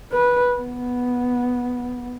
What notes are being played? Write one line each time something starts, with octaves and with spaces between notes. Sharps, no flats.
B4
B3